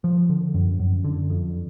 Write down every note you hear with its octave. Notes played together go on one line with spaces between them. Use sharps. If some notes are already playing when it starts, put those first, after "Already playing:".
F3
D3
F#2
F#2
D3
F2